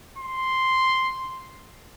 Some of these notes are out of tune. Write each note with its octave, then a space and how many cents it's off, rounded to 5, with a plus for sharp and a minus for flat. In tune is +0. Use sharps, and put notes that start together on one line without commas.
C6 +0